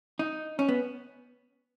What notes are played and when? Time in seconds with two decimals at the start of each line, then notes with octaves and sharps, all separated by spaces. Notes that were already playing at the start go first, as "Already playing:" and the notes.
0.19 D#4
0.59 C#4
0.69 B3